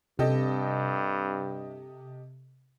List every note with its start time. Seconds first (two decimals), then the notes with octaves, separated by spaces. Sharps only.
0.19 G2 C3 G4 A4 D#5